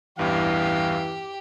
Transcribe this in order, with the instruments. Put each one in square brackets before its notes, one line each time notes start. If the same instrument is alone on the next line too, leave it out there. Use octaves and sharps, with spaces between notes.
[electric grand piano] A1 E2 G2 [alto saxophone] E3 [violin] G4 [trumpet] F5